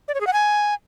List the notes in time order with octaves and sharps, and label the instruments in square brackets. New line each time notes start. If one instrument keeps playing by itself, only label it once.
[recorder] D5
C#5
G#4
F#5
G#5